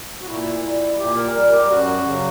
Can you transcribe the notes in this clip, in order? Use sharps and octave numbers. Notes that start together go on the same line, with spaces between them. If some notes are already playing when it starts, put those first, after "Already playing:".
F#4
A#2 E4
G3
A#2 G4
A#4
G3 A#4
G4
F#2 F#4
C#3 F#3